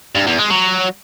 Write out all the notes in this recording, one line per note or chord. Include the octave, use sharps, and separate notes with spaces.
G2
E2
G#3
F#3